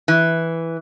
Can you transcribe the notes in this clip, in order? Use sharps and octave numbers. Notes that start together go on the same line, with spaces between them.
E3